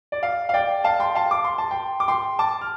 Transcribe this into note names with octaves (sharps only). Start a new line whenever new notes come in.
D5
F5
F5
D5 G5
F5 A5
G5 C6
F5 A5
D6
C6
A5
G5 C6
D6
G5 C6
A5 D6
F6